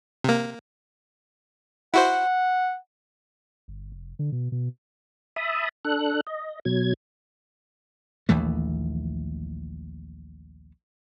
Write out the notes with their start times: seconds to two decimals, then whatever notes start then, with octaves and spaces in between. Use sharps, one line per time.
0.24 C3 A#3
1.94 E4 F#4 C5 F#5
3.68 G1
3.92 F1
4.19 D3
4.32 B2
4.52 B2
5.36 E5 A5 B5 D#6
5.85 D4 A4 F#6
6.27 D#5
6.65 B2 F#3 G#6
8.29 A#1 D#2 E3 A3